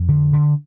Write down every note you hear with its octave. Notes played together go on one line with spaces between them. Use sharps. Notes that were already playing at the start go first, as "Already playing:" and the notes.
Already playing: F2
D3
D3